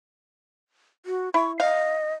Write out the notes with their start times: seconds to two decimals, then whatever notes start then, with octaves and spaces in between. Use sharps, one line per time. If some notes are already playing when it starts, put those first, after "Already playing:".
1.06 F#4
1.34 E4 C#6
1.60 D#5 F5